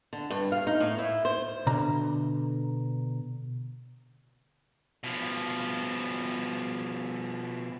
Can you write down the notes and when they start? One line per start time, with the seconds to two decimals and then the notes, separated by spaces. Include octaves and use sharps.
0.13 D3
0.30 G2
0.52 F5
0.67 D#4
0.80 A2
0.98 E4
1.25 C5
1.67 B2 D3 A#5
5.04 B2 F3